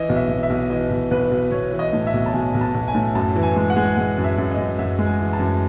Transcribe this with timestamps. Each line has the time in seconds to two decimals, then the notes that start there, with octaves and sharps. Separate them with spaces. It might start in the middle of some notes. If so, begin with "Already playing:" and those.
Already playing: E3 D#5
0.09 B1
0.16 E5
0.29 B1
0.43 E5
0.50 B1
0.70 E3 D#5
0.91 B1
1.11 B1 B4
1.31 B1
1.51 B1 C#5
1.73 E3
1.79 D#5
1.93 A2
2.07 E5
2.14 B1
2.26 A5
2.33 B1 G#5
2.54 B1
2.61 A5
2.75 B1
2.88 G#5
2.95 A2
3.15 F#2 A5
3.36 E3
3.43 G#5
3.56 G#3
3.70 F#5
3.77 G#3
3.97 G#3 F#5
4.18 F#2
4.24 E5
4.38 F#2
4.51 D#5
4.58 F#2
4.79 F#2 E5
4.99 G#3
5.06 G#5
5.20 E3
5.33 A5
5.40 F#2